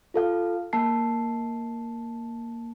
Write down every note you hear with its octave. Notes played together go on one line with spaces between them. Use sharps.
F4 A4 F5
A#3 A5 C7